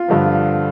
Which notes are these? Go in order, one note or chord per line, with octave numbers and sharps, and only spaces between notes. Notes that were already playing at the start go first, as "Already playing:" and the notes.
Already playing: F4
G2 D3 F3